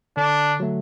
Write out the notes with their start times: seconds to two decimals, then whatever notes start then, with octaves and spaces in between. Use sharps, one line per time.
0.17 D3 D4
0.60 F#3 A3